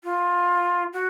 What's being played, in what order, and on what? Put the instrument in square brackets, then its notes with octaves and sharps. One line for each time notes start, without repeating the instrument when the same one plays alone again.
[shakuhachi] F4
F#4